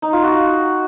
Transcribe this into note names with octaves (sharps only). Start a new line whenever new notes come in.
D#4
F4
F#4